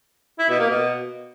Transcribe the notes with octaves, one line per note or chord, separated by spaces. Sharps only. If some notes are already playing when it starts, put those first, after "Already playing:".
E4
B2
A#3
B2